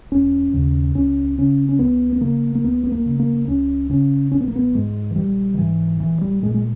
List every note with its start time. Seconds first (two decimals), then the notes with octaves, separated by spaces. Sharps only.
0.12 E1 C#4
0.53 D#2 C#3
0.95 C#2 C#4
1.38 C#3 C#4
1.69 C#4
1.79 C#2 B3
2.13 B3
2.21 C#3 A#3
2.55 A#3
2.63 C#2 B3
2.83 B3
2.92 A#3
3.06 C#3
3.20 A#3
3.47 C#2 C#4
3.89 C#3 C#4
4.31 A#1 C#4
4.41 B3
4.48 A#3
4.56 B3
4.75 G#2 G#3
5.11 E3
5.16 A#1 G3
5.54 D#3
5.58 G#2 E3
6.00 A#1 E3
6.21 G3
6.42 A#2 G#3
6.54 G#3